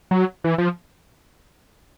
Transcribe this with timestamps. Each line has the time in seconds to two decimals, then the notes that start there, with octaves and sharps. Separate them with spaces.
0.11 F#3
0.44 E3
0.58 F3